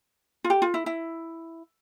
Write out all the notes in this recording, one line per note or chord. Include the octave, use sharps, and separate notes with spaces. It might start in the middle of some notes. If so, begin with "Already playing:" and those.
F4
G4
F4
E4
E4